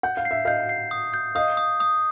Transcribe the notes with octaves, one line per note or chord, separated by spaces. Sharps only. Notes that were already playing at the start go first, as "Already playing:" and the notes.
F#5 G6
F5
C7
E5
D#5 F5 G6
C7
D#6
G6
D#5 F5 D#6
D#6
D#6